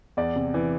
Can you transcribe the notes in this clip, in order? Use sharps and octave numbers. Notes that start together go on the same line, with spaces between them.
E2 D5
C3
E3